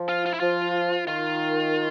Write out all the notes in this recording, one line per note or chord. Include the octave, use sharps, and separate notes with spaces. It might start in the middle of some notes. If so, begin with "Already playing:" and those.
Already playing: F3
F4
F4
E4
F3 F4
D#3 F4